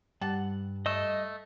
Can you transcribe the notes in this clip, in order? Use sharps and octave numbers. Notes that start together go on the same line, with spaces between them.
G2 G3 F#5 A5
A3 D#5 E6